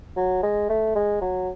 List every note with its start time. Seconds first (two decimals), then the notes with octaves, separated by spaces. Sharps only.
0.17 F#3
0.43 G#3
0.69 A3
0.96 G#3
1.22 F#3